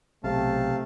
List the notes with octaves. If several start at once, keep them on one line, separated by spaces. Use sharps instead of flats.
B1 C3 A3 F5 A5